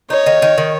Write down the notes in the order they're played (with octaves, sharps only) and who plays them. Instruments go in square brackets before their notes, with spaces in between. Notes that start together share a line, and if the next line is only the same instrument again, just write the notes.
[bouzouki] D#4 [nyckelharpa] C#5
[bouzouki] D#3
D#3
D#3